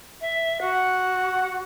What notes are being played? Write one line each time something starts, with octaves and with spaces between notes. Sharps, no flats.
E5
F#4 F#5